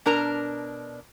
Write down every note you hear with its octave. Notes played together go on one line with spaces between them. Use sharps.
B2 D4 A#4 A#5